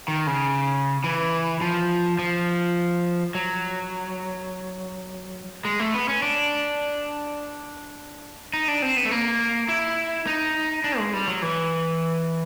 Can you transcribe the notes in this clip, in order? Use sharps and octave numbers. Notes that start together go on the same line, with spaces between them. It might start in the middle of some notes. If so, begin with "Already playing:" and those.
D#3
C#3
E3
F3
F3
F#3
G#3
A3
B3
C#4
D4
D#4
D4
C4
B3
A3
A#3
E4
D#4
D4
G#3
G3
F#3
E3